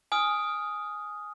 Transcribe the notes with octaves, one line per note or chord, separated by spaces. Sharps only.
G#5 D#6 F6